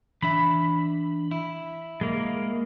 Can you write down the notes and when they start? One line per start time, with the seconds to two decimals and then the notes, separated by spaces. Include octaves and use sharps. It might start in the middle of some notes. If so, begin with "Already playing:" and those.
0.22 E3 D4 E5 B5
1.31 E4
2.01 G#3 A#3